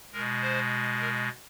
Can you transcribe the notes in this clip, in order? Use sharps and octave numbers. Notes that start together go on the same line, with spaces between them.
B2 G#3 A#4
C5
A#4